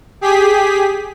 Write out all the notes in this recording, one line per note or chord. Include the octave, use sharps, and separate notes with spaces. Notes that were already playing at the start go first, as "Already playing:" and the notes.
G4 G#4 B6